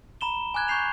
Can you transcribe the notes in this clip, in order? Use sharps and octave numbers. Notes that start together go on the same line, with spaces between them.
A#5 B5 E7 G7
G#5 D6 F#6 G#6
C#6 G6 C7 F7